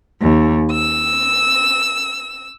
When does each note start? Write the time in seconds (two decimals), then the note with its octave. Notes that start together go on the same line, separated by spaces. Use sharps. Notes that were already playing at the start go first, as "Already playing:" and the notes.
0.22 D#2
0.72 E6